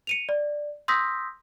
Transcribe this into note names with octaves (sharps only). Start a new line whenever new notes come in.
C#7 D#7 F7
D5
C6 D#6 E6 G6 A#6 B6